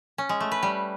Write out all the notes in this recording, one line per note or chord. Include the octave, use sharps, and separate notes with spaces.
C#4
G#3
A3
B4
G3